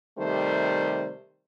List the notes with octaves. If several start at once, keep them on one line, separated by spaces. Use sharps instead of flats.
C3 D#3 G3 A3 C5